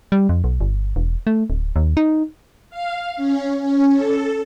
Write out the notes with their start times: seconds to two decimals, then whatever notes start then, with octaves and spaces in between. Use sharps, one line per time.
0.12 G3
0.29 F2
0.44 B1
0.61 G1
0.96 E1
1.27 A3
1.50 D1
1.76 D#2
1.97 D#4
2.70 F5
3.17 C#4
3.61 C#4
3.93 A4